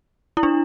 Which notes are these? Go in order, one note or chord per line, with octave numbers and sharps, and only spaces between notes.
E4
D4